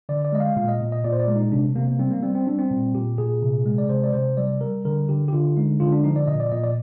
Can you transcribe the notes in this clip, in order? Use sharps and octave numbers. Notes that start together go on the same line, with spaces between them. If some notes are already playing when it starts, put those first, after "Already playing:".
D3 D5
D5
G#3 D#5
F5
A#2 F5
D#5
A#2
D#5
A#2 D5
C5
D5
G#3
D#4
C3 D4
C3 A#3
A#3
G3 C4
A#3
G3 C4
C4
G3 D4
C4
A#2
A#2 G4
A#2 G#4
C3
G#3
D5
C3 C5
D5
C3 C5
G3 D5
G3 A#4
D3 A#4
D3 G4
G4
D3 F4
G#3 D#4
D3 F4
D4
F3 D#4
D5
A#2 D#5
D5
A#2 D#5
D5